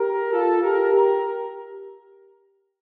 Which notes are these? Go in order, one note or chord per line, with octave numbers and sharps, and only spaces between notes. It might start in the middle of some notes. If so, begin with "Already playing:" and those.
Already playing: G4 A#4
F4 A4
G4 A#4
G4 A#4